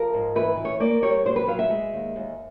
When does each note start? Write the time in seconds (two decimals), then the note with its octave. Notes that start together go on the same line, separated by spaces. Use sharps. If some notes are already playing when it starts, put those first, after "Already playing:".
Already playing: F3 A#4
0.14 G#2
0.35 E3 B4
0.57 E3
0.65 C#5
0.80 A#3 D5
1.03 G3 C#5
1.25 F#3 C5
1.36 B4
1.48 F#3 F5
1.59 E5
1.70 G#3
1.93 D#2
2.16 D#2